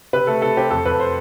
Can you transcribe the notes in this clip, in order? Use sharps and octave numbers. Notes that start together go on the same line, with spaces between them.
C3 B4
A3 A4
C3 A4
C4 G4
F2 A4
F2 B4
C5